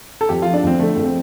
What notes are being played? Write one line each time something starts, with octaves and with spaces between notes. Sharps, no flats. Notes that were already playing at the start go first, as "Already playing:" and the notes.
A4
F2 G4
F4
F3
D4
F2 C4
D3 A3
F2 A3
C4